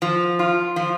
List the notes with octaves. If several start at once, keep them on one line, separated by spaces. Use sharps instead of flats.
F3
F4
F3